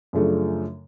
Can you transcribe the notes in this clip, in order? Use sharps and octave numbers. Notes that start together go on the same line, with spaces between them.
F#2 C#3 F3 A3 D4